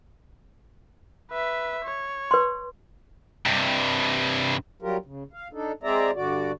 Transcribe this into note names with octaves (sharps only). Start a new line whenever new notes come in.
B4 E5
C#5
B4 C6
G2 C3
F#3 G3 F4 G4 A#4
C#3
F5
D4 D#4 A4
G#3 C4 G#4 D5 E5 A#5
G2 D3 F#4 D5